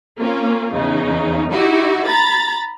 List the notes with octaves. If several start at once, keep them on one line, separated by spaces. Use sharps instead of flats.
A#3 C4 C#4 F4
E2 C#3 D#4
D#4 E4 F#4 G4
A#5 B5 A6